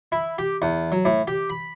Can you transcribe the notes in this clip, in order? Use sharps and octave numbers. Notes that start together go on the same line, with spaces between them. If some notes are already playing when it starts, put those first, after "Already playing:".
E4
G4
E2
F#3
A2
G4
B5